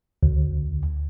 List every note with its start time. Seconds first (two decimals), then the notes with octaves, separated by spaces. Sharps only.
0.23 D2